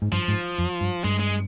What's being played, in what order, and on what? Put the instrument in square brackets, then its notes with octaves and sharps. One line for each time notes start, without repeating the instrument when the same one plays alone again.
[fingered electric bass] G#2
[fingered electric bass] G2 [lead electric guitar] F3
[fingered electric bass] G#2
F2
G2
[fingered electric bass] G2 [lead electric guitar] G#3
[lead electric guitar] G#3